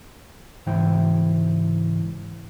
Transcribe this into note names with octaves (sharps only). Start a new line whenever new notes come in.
C#2 G#2 E3 E4 C5 G5